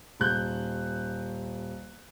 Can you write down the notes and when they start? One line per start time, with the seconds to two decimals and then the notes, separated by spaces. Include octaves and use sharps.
0.20 D#1 F#6 G6